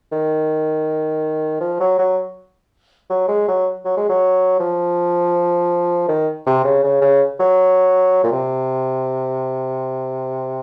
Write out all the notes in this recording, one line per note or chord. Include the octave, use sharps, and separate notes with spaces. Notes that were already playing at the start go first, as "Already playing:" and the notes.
D#3
F3
F#3
F#3
F#3
G#3
F#3
F#3
G#3
F#3
F3
D#3
C3
C#3
C#3
C#3
F#3
A#2
C3